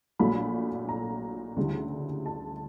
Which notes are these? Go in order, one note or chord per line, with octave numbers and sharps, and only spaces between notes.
A#1 A#2 F#3 A3 B5
A#5
D2 C#3 E3 G3
A5